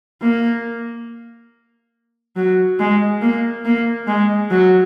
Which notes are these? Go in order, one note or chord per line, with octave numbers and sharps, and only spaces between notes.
A#3
F#3
G#3
A#3
A#3
G#3
F#3